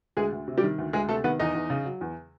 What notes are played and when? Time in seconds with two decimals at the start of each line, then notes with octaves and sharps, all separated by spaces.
0.17 D2 G#3 G#4
0.32 D2
0.48 C3
0.58 G3 G4
0.63 D#3
0.78 D2
0.93 D2 G#3 G#4
1.08 C3 A3 A4
1.24 D#3 B3 B4
1.39 E2 D#4 D#5
1.55 E2
1.70 C#3
1.85 F#3
2.01 E2